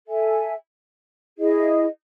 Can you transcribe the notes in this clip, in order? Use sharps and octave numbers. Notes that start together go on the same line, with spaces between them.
A4 E5 G#5
E4 G#4 D#5